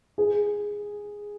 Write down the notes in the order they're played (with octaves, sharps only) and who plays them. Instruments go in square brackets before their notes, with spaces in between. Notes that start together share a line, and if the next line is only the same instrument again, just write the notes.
[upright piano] G#4